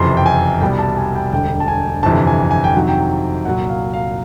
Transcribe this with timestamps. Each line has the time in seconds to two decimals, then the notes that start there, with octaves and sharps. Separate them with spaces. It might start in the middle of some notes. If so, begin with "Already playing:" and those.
Already playing: F#1 F2 C3 E3 C6
0.17 G5
0.26 G#5
0.61 C2 B2 G3 G5
0.79 A5
0.97 G#5
1.15 G5
1.32 E1 D2 D3 G3 G5
1.60 A5
1.68 G#5
2.03 G1 F2 C3 E3 A5
2.27 G#5
2.51 G#5
2.64 G5
2.74 F2 C3 D#3 F#3 F#5
2.88 G5
3.45 C2 A#2 F#3 F#5
3.69 F5
3.93 F5